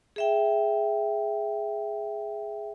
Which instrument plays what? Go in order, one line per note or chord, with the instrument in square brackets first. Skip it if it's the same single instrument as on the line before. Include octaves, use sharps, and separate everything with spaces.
[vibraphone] G#4 E5 G5